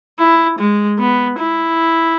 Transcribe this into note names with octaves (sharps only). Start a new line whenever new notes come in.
E4
G#3
B3
E4